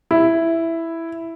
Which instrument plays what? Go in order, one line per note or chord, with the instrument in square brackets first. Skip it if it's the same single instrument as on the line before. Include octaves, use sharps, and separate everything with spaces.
[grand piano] E4